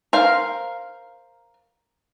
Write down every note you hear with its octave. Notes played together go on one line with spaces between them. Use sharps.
A#4 C5 F5